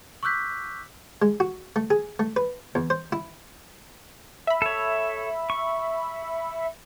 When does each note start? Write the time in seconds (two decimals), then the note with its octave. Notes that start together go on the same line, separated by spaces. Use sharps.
0.23 C#6 D6 E6 F#6 G6 B6
1.22 G#3
1.40 F#4
1.76 A3
1.90 G#4
2.19 A3
2.36 B4
2.75 E2
2.90 C5
3.12 E4
4.47 E5 B5
4.62 A4 C#5
5.50 C#6